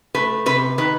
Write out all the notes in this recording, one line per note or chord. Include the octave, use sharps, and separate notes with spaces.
A3 B4
C3 B4
D#3 B4